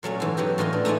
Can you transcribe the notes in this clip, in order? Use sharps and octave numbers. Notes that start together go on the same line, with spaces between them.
A#2 F#3 A3 C#4
G#2 E3
F#3 B3 F#4 G4
A2 E3 F4 D#5
D4
A3 D#4 A4 D5 G#5